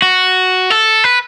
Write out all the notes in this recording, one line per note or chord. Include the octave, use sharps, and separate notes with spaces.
F#4
A4
B4